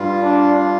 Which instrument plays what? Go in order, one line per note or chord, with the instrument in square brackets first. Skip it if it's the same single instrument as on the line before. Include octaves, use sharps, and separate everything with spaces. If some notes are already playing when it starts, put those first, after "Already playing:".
Already playing: [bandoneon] G2 G3 F4
[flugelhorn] D4